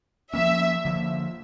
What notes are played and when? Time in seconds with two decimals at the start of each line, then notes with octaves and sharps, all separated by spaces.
0.34 F3 A#3 C#4 E5
0.85 D3 F3 A#3